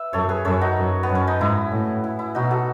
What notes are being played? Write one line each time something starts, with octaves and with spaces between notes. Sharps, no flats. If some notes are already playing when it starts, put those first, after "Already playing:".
Already playing: B4 E5
F#2 A4 C#5
G#4 B4
F#2 A4 C#5
D#4 F#4
F#2
B3
F#2
C#4
D#4
G#2 E4
A2
E4
E4
B2 D#4 F#4
F#4 A4